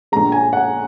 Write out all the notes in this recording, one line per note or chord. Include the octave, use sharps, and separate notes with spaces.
A#1 A#2 G#3 A#5
G#5
F#5